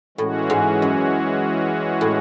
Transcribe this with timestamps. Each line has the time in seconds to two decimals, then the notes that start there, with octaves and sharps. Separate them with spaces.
0.17 A2 E3 G#3 C#4 F#4
0.50 G#2
0.82 F#2
2.01 A2